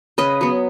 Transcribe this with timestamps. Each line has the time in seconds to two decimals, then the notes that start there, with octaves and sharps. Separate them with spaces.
0.18 C#3 B4 D#5
0.41 F#3 B3